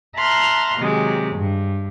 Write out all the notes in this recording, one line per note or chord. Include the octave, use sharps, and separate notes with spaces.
E5 A5 A#5 C6 F6 F#6
C3 D#3 F#3 G#3
G2